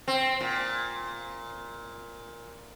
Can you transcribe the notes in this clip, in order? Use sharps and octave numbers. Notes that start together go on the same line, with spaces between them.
C4
A#2